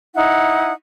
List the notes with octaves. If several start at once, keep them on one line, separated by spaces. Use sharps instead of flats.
D#4 E4 F#5